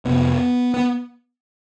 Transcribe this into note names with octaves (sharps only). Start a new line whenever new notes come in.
F2 C3 B3
B3